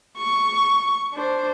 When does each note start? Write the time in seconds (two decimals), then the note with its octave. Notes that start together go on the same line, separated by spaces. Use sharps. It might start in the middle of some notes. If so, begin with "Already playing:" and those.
0.17 C#6
1.13 D4 C5